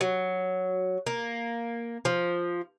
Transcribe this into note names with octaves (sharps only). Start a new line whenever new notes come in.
F#3
A#3
F3